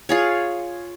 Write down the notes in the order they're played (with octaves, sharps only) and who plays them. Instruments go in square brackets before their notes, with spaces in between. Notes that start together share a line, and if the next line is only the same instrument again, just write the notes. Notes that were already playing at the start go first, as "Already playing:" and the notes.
[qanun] F4 G#4 C#5